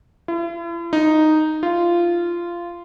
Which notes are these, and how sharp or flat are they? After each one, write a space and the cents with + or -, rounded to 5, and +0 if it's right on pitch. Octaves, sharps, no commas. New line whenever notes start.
E4 +45
D#4 -5
F4 -15